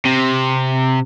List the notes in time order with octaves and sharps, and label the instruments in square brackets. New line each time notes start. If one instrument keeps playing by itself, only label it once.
[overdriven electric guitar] C3